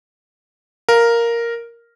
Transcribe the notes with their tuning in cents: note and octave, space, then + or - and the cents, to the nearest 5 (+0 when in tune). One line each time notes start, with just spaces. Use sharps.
A#4 +0 F5 +0